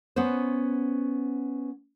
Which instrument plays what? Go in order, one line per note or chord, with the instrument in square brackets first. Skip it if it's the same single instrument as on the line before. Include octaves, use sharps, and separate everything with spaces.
[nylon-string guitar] B3 C#4 B4 C5